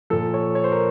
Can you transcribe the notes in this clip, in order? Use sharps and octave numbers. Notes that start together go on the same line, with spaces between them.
A#2 F3 A4
C#5
C#5
C5
A#4